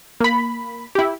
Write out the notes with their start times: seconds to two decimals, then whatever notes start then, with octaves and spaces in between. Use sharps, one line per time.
0.21 A#3 B5
0.95 E4 G4